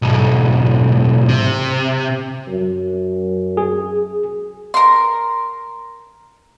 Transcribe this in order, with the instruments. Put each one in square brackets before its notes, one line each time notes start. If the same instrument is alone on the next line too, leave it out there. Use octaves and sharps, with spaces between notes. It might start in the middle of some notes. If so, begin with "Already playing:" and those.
[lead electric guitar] B1 G#2
C3
[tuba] F#2
[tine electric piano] G#4
[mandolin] A#4 C6